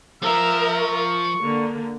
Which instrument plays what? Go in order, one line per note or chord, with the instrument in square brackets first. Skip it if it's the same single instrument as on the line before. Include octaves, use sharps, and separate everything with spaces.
[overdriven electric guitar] F3 [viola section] A#4 E5 [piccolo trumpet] E6
[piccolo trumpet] C#6
[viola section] D3 A#3